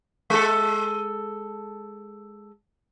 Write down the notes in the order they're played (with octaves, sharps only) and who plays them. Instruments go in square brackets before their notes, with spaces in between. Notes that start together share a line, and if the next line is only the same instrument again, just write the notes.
[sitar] G#3 A4